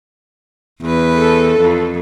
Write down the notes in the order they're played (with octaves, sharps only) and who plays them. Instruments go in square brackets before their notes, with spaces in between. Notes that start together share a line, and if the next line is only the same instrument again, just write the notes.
[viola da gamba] E2 B4
[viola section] A4
[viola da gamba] F2